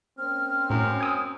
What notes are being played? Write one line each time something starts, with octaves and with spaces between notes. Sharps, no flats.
A#3 C4 C#4 F6
F#2 A2
G#5 D#6 E6